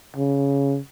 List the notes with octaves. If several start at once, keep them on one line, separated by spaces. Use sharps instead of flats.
C#3